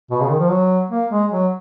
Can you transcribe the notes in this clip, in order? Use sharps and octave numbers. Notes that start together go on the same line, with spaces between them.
B2
C#3
D#3
F3
F#3
A#3
G#3
F#3